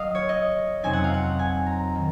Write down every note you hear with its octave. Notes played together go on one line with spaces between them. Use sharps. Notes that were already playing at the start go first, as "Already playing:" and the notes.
Already playing: F#3 D#5 F5
C#5
D#5
F2 C3 F#3 C4 D#4 G#5
F#5
F5
F#5
G#5
A#5
D#3 A#3